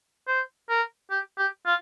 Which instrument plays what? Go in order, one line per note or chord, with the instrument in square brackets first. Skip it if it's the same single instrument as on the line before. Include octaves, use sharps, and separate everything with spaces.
[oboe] C5
A#4
G4
G4
F4